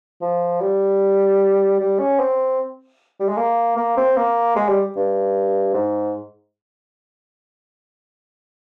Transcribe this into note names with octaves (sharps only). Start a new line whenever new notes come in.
F3
G3
G3
C#4
C4
G3
G#3
A#3
A#3
C4
A#3
G#3
G3
G2
G#2